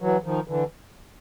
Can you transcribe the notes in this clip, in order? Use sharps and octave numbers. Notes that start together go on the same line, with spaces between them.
E3 F#3
D#3 F3
D3 E3